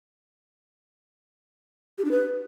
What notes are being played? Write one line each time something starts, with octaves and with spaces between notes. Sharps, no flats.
G4
D4
B4